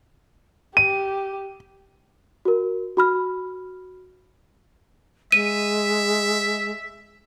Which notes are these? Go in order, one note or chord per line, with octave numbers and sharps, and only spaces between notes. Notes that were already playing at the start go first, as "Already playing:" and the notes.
G4 D#7
F#4 A#4
F#4 B5 F6
G#3 E5 D#7